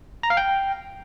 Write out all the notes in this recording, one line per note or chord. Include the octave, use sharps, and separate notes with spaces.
A#5
F5
G5